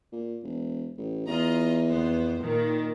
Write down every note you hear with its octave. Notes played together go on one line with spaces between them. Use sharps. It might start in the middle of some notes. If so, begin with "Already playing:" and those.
A#2
E1
A1
E2 F4 D#5 A#5
F2 B3 C5
A#2 D#3